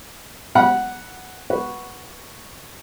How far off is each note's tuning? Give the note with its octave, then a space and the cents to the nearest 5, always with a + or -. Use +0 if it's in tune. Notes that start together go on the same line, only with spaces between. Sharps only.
F#5 +0 B5 -25
F#4 +0 B4 -10